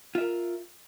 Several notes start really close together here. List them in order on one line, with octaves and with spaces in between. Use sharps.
F4 E5 A#4